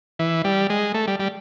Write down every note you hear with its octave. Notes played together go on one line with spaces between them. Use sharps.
E3
G3
G#3
A3
G3
G3